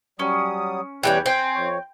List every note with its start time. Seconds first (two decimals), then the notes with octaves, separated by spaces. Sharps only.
0.19 F#3 G3 C#4 D#6
1.03 E2 E3 G3 C#4 B4 G5
1.26 C4 G5 G#5
1.54 F2 C#5